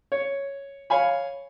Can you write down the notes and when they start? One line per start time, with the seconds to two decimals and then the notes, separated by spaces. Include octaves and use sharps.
0.12 C#5
0.90 C#5 F5 G#5 B5